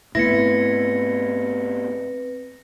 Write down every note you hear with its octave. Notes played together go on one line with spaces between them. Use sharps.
G#2 A3 B3 C4 E4 B4 A#6 C#7